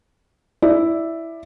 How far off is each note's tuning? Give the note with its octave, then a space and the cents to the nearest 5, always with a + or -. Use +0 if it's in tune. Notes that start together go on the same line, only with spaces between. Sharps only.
E4 +0 D5 +10